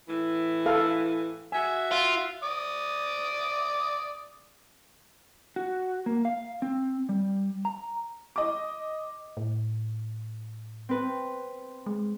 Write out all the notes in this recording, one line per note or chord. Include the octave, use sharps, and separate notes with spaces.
A2 E3
A4 F5
F#4 E5 G#5
F4
D5 D6 D#6
F#4
A#3
F5
C4
G3
A#5
D#5 D6
A2
C4 B4
G#3